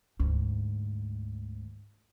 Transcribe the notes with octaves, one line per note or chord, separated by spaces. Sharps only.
D2 G#2